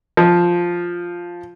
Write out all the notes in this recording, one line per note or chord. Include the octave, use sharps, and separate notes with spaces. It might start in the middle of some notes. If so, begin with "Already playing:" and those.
F3